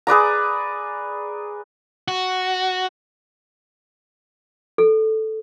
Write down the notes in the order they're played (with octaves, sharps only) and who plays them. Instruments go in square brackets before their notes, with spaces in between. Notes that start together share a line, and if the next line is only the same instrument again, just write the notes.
[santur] G#4 B4 D5 A#5
[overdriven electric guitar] F#4
[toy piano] A4